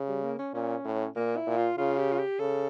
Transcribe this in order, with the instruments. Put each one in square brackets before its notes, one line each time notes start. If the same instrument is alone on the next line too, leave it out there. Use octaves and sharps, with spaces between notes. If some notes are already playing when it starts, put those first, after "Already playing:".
Already playing: [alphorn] C#3
[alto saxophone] G3
A#3
C#4
[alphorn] A#2 [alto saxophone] C#4
[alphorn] A2
[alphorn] A#2 [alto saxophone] A#3
[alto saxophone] E4
[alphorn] A#2
[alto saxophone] F4
[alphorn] C#3 [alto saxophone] F4
[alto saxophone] G4
F4
G4
[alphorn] C#3 [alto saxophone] A4